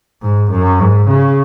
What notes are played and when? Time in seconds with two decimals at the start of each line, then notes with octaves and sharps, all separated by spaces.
0.22 G#2
0.50 F#2
0.79 G#2
1.07 C#3